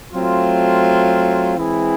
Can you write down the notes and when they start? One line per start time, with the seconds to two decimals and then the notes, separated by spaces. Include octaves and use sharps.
0.13 F#3 A3 C4 F4
1.57 E3 G#3 C4 E4 G#4